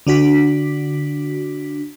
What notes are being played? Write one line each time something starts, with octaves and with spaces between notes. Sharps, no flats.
D3 D4 F#4 B6